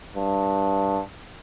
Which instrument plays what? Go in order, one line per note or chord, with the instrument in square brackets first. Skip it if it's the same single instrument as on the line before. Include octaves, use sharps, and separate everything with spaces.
[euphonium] G2